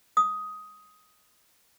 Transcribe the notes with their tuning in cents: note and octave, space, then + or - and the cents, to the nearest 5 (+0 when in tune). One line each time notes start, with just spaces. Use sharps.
D#6 +10